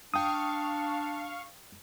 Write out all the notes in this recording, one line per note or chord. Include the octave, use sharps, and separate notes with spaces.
D4 F5 G5 C#6 D#6